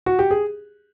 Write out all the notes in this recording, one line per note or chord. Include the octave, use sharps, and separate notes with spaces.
F#4
G4
G#4